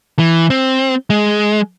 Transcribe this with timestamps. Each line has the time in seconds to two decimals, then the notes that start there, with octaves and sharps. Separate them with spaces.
0.19 E3
0.50 C4
1.10 G#3